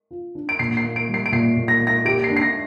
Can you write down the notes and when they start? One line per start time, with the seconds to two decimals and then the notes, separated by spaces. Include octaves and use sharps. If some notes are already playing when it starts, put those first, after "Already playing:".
0.11 F4
0.35 D4
0.49 D7
0.59 A#2 C7
0.77 C7
0.84 A#3
0.96 D7
1.09 G3
1.14 C7
1.26 D7
1.32 A#2 C7
1.57 A#2
1.68 A#6
1.81 A#3
1.87 A#6
2.05 G4 D7
2.24 C7
2.29 D4
2.37 C7
2.42 A#6